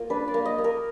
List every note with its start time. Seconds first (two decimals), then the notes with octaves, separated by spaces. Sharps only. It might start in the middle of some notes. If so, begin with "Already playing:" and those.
Already playing: A#3 F4
0.10 D4 B4
0.28 D5
0.34 A#3
0.45 D#5
0.58 A#3
0.64 A#4